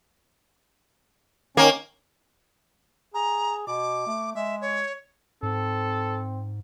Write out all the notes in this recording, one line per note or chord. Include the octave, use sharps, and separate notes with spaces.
D#3 A#3 C#4
G#4 A#5
B2 D6
A3
G#3 E5
C#5
G#2 C4 A4